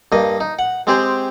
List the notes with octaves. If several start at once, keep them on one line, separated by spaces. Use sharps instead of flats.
G2 A#3 D#5
D#4
F#5
G#3 C4 G4 G#4 C5